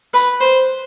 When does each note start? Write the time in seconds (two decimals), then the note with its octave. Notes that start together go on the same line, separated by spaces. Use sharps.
0.14 B4
0.41 C5